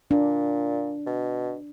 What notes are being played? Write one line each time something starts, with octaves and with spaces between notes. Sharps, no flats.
A#2 D4
B2